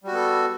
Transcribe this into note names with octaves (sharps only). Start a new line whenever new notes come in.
G3 B3 F#4 A4